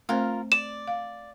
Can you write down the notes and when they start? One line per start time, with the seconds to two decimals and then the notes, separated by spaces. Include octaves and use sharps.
0.09 A3 C4 F4 A#4 C5
0.52 D5 E7
0.88 F5